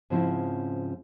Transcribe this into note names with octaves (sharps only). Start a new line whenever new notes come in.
G#2 C#3 F3 C4 C#4 E4